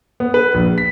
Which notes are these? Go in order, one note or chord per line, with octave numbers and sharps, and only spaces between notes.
B3
B4
A#1
B6